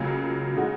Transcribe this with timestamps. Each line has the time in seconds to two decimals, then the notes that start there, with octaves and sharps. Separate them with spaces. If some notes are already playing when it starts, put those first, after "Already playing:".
Already playing: C#2 C#3 F#3 A#3 F4
0.56 C#3 G#3 D#4 F#4